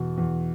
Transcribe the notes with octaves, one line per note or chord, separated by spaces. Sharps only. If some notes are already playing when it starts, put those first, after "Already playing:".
Already playing: E2 B2
E2